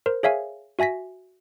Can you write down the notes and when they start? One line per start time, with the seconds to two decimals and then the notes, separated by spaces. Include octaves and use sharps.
0.06 A#4 C5
0.23 G#4 C#5 E5 F5 G#5
0.79 F#4 E5 G#5 A#6 B6